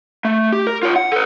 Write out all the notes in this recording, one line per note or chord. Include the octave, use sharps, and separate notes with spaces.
A3
G4
A#4
F4 C#5
F#5
A4 B4